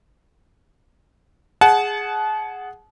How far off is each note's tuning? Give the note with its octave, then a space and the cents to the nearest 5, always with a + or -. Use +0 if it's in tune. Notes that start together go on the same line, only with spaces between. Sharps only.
G#4 +0 F#5 +0 A5 -35